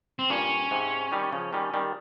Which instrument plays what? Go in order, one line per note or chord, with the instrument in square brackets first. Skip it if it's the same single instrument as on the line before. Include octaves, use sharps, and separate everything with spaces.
[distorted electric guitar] C4
[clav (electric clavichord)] G2 A#2 [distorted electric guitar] C#4
[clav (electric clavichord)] G#2 C3
D#3 G3
C#3 F3
D#3 G3
D#3 G3